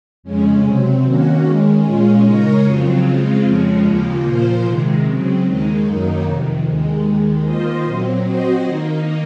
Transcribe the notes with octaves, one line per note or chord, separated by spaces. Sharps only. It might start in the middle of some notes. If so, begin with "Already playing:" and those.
F2 C#3 G#3 C#4
C3 F#3 C4
D#3 A#3 C#4 F#4
D#3 G#3 C#4
A#2 G#3 C#4 F4
C#3 G#3 D#4 A#4 C#5
F2 C#3 F#3 C4 F4
C#3 G#3 C4 F4
F2 C#3 F3 G#3 C#4
D#2 C#3 F3 A#3 F4
A#2 F3 A#3 F4 C5
C3 D#3 G#3
C#3 F#3 C4
D#2 D#3 G#3 D#4
F#2 D#3 F#3 A#3 D#4
F2 C3 D#3
D#2 D#3 G#3
D#2 D#3 G#3
D#3 A#3 F4 C5 D#5
A#2 F#3 C4
F#3 C4 F#4 C5 D#5
D#3 A#3 D#4